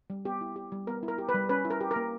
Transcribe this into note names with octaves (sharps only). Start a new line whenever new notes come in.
G3
B3 G4
E4
G4
G3
B3 A#4
E4
A#4
G4
B4
G3
C#4 B4
E4
A#4
G4
A#4
A#3